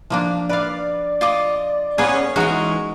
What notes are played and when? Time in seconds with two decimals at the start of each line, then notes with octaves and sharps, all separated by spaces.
0.10 F3 A#3 D4
0.49 B4 D5 F5
1.21 F4 D#5 D6
1.98 A#3 B3 C#4 G#4
2.36 E3 G#3 C#4 D#4 F#4 A#4 C#6